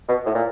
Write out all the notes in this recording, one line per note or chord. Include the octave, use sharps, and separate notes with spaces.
B2
A2
A#2